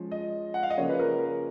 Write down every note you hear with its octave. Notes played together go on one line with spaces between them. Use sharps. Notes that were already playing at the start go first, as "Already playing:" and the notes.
Already playing: F3 G#3 C#4
D#5
F#5
F5
D#5
C#3 F3 A#3 C#4 C#5
B4
A#4